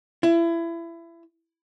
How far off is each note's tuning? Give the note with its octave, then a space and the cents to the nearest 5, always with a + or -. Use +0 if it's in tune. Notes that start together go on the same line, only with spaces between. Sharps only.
E4 +25